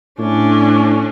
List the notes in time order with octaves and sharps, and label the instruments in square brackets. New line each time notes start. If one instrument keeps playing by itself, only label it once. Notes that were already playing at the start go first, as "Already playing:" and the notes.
[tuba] A2 [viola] C#4 D4